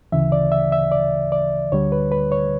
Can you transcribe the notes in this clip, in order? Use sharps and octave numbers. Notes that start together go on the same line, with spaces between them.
D2 C#3 E3 E5
D5
E5
E5
D5
D5
D2 D3 G3 C#5
B4
B4
C#5